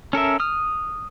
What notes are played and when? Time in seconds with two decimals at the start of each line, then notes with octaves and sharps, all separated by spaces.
0.13 C#4 A4 A#4 E5
0.40 D#6 F6